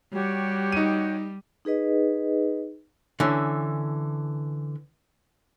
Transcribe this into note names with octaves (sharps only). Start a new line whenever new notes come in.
G3 F#4 G4 C#5
D#4 D#7
D#4 G#4 B4 D#5
D3 E3 C#4